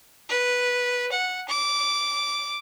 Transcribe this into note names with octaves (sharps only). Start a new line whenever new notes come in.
B4
F#5
D6